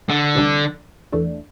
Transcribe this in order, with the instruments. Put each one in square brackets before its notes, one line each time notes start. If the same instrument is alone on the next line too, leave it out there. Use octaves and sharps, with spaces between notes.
[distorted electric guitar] D3
[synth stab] D2 C3 E3 G3 D4
E2 E3 A3 D4